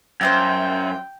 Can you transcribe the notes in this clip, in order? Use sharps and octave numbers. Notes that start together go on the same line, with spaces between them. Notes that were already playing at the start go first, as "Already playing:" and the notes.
F#2 E4 F4 C5 G5